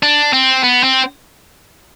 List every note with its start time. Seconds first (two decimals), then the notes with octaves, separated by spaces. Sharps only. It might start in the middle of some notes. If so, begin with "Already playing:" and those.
0.03 D4
0.33 C4
0.63 B3
0.83 C4